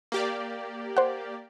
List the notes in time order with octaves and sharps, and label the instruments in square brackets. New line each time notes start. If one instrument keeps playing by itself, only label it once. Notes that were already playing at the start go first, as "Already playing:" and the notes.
[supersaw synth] A#3 G4 D5
[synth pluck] C5 F#5